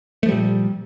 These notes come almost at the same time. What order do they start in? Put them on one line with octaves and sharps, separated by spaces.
A3 F3 G3 A#2